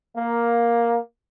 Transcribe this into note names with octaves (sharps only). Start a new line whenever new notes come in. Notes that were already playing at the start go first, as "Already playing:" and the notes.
A#3